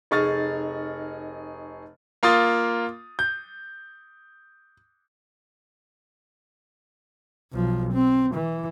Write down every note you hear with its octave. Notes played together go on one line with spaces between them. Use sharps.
F1 D#4 G#4 C#6 F6 A6
A#3 F4 C6 D#6 A6
G6
B1 F3
C4
E3